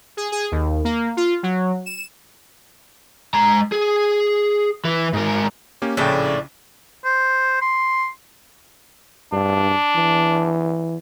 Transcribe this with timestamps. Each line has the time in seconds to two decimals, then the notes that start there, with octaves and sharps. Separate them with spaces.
0.17 G#4
0.32 G#4
0.52 D#2
0.85 A#3
1.17 F4
1.43 F#3
1.86 E7
3.34 G#3 A#5
3.72 G#4
4.85 E3 B4
5.13 G#2 A#4
5.82 A#3 C#4 G4
5.97 A#1 A2 C#3 D4 G5
7.05 C5
7.61 C6
9.32 G2 D4
9.95 E3